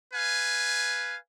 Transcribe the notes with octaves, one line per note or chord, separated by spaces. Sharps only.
B4 F5 G#5